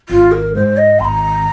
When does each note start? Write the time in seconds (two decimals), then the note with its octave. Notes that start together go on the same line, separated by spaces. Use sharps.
0.09 G#1 F4
0.32 A#4
0.55 G#2 G#3 C5
0.77 D#5
0.99 G#1 C6
1.05 A#5